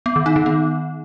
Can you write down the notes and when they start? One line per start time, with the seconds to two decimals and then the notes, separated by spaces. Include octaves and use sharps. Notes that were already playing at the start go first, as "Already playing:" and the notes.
0.06 B3
0.16 D#3
0.26 D#4
0.36 D#3
0.46 B3